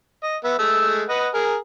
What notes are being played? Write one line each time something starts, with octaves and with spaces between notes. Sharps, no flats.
D#5
B3 E5
G#3 A3 E6
B4 D#5 F#5
G#4 A#4